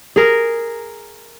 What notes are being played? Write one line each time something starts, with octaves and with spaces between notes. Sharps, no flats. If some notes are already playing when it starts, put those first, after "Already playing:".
G#4 A#4